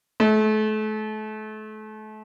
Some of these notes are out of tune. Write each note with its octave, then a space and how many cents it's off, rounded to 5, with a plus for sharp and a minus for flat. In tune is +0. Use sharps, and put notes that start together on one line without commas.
A3 -35